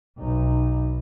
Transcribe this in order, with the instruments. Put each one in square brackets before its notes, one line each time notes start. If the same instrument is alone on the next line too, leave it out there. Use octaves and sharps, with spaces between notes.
[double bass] B1 D#4